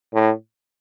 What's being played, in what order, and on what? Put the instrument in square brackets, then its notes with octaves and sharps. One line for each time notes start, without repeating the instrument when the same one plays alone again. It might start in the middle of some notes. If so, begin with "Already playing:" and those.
[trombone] A2